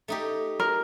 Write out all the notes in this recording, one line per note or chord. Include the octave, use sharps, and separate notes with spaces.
A3 D#4 G4
A#4